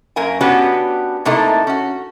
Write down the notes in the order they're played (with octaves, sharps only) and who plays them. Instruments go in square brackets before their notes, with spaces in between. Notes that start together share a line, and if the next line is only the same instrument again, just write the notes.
[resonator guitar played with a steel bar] F#2 A#3 A#4 G#5
B3 C#4 D4 F#4 G4 B4
C3 A3 A#3 D#4 E4 A4
C#4 F#4